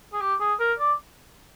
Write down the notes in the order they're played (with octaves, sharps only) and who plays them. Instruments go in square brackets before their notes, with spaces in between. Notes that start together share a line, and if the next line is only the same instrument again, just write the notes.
[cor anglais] G#4
G4
G#4
A#4
D5